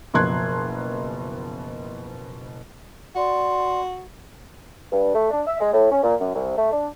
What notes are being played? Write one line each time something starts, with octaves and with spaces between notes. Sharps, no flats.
F#1 B2 F3 C6 F#6 G#6
F#4 D5 C6
G2
A3
D4
E5
G#3
A2
C#4
A#2
F#2
C2
A3
D4